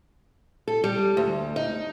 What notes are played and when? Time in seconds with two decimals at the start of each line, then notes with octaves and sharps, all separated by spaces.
0.68 A4
0.84 G3
1.17 D2
1.56 D#4